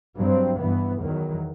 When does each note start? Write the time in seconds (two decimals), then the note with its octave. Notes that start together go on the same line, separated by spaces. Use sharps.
0.18 G2 F#3 C4
0.59 G2 E3 B3
1.00 E2 D#3 F#3